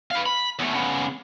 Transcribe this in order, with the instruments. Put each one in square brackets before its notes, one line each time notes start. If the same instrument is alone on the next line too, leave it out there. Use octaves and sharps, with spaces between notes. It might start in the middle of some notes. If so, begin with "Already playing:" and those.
[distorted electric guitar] B4 F5
B5
E2 A3
C#3 B3